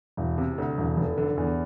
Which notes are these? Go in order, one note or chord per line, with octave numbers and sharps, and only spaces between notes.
E1
C3
D2
E1
F1
D3
E2